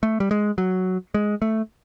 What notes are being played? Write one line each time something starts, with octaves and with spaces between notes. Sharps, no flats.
A3
G3
G#3
F#3
G#3
A3